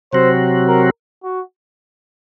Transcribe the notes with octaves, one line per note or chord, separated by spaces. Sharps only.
C3 F#3 C4 F#4 C5
A#4
F#4